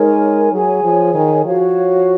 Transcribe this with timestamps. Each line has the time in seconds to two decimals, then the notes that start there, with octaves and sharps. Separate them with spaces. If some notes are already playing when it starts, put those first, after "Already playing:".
Already playing: G#3 D#4 A#4 C#5 G#5
0.52 F#3 G#4 C#5 G#5
0.83 F3
1.14 D#3
1.45 F3 F#4 C#5 F5